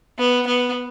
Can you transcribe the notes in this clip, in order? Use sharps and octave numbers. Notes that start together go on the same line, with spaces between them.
B3
B3